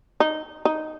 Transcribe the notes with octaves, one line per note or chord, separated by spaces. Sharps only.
D#4
D#4